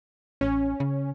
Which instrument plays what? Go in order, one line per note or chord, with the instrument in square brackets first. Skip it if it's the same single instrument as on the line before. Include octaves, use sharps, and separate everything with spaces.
[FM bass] A1 [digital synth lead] C#4
[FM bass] C#3